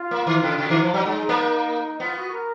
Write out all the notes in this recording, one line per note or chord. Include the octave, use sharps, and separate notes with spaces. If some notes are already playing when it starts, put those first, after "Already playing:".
Already playing: F4
A#3
D#3
C#3
C#3 F#4
D#3 F#4
F3 F4
F#3 D#4
G#3 D#4
A#3
B3 F4
F#4
A#4